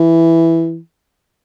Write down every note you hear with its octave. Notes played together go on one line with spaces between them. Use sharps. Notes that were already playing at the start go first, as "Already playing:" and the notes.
Already playing: E3